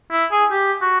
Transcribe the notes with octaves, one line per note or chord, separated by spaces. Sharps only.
E4
G#4
G4
F#4